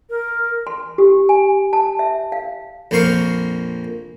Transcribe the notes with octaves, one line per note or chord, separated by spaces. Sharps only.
A#4
C6
G4
G#5
A5
E5
F5
A#1 F2 A#3 C5 F5 C#6